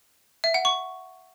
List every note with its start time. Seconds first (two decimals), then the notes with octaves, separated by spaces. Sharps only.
0.44 E5
0.54 F#5
0.65 C#6